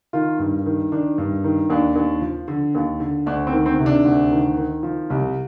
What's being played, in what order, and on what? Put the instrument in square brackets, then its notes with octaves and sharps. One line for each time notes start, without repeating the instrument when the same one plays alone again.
[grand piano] D#3 F4
G2
D#3
D#3 D4
G2
D#3
D#2 D4
D#2
F3
D3
D#2
D3
D2 D4
C4
D#3
C4
C3
D4
D2
D#3
D#3
F3
C2